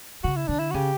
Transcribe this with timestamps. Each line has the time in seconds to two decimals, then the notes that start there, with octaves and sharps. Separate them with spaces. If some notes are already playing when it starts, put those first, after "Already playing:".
0.24 C#3 F#4
0.36 E4
0.48 D3 D4
0.59 E4
0.71 F#4
0.74 C#3 G4